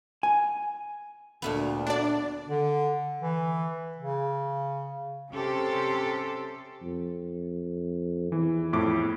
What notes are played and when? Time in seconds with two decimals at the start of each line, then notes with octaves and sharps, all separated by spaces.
0.23 G#5
1.42 D2 A#2 A3 B3
1.87 D4 D5
2.49 D3
3.22 E3
3.98 C#3
5.30 C3 C#4 G4 A4 C5
6.82 F2
8.32 E2 E3
8.73 F2 A2 D6